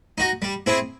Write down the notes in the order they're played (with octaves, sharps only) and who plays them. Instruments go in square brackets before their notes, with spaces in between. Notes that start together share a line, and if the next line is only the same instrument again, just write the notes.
[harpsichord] D#4 F#4
G3
C4 E4 G#4